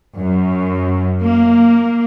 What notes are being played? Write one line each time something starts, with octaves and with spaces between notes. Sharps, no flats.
F#2
A#3